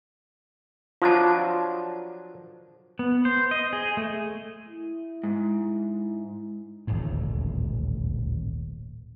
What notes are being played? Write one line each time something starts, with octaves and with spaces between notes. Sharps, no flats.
F3 F#3 D4 F4 A5
B3
C5
D#5
G#4
A3
E4
G#2
D#1 A1 D2 G#2